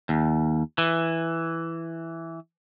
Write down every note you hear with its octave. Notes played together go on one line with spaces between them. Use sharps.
D#2
E3